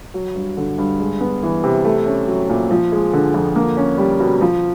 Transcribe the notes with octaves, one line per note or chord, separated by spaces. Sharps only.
F#3
G2
D3
G2
G#3
B3
E3
C3
A3
C#4
F#3
A#2
F3
G#3
D3
F2
A#3
C#4
G3
B2
F3